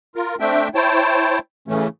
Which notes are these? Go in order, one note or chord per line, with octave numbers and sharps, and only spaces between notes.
F4 A#4
A3 C4 D4 E5 G5
E4 C5 C#5 G5 A5
A2 C#3 E3 A3 C#4